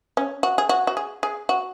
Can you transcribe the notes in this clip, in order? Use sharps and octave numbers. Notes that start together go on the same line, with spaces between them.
C#4
F#4
G#4
F#4
F#4
G#4
G#4
F#4